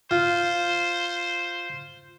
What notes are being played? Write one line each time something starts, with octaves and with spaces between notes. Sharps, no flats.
F4 C5